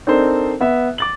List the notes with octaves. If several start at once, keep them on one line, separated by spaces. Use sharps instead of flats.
C4 D4 D#4 A4 A#4 C5
B3 E5
D6 A6 F#7